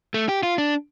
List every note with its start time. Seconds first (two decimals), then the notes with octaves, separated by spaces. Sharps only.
0.14 A3
0.29 G4
0.43 F4
0.58 D4